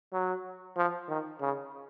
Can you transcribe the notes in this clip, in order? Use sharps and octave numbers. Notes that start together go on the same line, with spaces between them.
F#3
F3
D#3
C#3